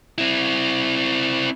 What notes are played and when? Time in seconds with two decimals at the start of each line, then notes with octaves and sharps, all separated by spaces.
0.18 C4 E4